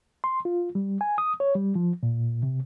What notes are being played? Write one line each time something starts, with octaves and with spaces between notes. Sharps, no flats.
C6
F4
G3
G#5
D#6
C#5
G3
F3
A#2
C3